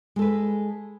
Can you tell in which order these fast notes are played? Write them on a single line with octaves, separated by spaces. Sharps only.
G#3 A4 B4